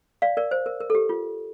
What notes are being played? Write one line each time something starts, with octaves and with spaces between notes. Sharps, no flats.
D5 F5
A#4 D5
C5
A#4
A#4
A4
G4
F4